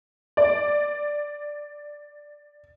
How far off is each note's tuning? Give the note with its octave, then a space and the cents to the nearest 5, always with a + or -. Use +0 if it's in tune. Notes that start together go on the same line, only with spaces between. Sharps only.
D5 +10